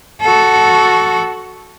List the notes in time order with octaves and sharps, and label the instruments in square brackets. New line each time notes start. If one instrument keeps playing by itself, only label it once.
[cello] F#4 A4